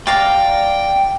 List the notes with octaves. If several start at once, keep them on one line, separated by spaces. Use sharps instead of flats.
D5 F5 G5 A#5